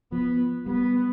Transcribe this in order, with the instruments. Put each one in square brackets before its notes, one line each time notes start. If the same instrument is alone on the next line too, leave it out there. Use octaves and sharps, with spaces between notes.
[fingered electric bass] F3 [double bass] B3
[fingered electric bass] G3 [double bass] B3